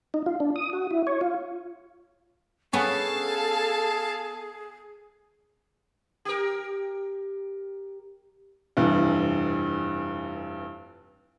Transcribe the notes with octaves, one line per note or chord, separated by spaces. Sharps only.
D#4
F4
D4
D#6
F#4
E4
C#5
F4
B3 C#4 G#4 A4 F5 A5
G4 A#4
F1 G2 E3